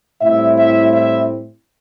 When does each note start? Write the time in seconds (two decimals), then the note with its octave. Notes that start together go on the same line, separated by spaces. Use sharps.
0.21 A2 G3 C4 E4 E5
0.57 E5
0.94 E5